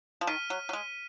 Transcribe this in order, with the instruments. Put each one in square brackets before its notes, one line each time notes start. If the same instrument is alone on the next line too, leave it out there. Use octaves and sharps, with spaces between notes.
[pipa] F3
[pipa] D#3 [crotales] F6 B6 D#7
[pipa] F#3
F#3
G#3